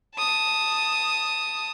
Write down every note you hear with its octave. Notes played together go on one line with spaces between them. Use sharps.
A5 D#6